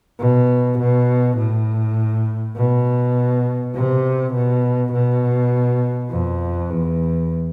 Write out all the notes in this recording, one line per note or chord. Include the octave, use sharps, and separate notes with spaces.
B2
B2
A2
B2
C3
B2
B2
F2
E2